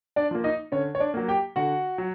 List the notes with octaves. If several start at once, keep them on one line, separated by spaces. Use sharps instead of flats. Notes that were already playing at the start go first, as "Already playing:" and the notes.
D4 D5
F3 A#3
D#4 D#5
D3 C#4 C#5
C#5
D4 D5
F#3 A#3
G4 G5
D3 F#4 F#5
F#3